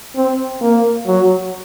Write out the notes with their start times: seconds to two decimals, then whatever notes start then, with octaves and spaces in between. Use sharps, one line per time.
0.15 C4
0.61 A#3
1.06 F#3